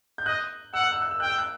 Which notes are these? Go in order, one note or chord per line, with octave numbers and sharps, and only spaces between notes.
G6
D#5 F#6
F#5 E6
F#6
E6
F#6
E6
G5 F#6
E6
F#6